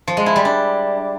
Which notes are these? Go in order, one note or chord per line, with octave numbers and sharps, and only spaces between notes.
F3
G#3
E4
G3
D4